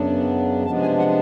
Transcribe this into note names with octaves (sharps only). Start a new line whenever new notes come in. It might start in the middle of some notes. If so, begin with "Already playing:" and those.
Already playing: F#2 C#3 F#3 B3 D4
C3 F3 G#3 B3 D4 A5
G#5
F#5